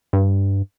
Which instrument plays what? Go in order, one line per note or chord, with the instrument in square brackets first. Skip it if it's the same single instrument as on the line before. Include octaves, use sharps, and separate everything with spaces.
[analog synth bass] G2